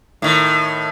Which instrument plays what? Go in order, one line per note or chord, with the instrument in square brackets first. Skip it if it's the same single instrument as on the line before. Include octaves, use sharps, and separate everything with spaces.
[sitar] A2 D#3